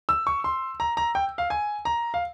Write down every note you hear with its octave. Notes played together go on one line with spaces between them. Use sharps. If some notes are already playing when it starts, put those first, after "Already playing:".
E6
C#6
C6
A#5
A#5
G5
F5
G#5
A#5
F5